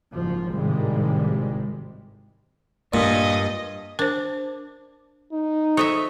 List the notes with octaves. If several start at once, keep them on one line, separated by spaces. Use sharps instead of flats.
F#1 G#2 F3
G#1 A2 C3 D#3 G3 G#3
G2 A#2 D#5
D4 A#4 C5
D#4
A4 C5 C#5 D#5 E5 D#6